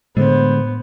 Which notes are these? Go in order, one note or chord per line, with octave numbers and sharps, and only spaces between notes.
A2 D3 G#3 B3 C5